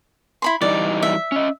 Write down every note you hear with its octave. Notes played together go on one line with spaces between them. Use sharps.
E4 B5 C6
E3 G3 D#4 D5
E5
C#4 D#5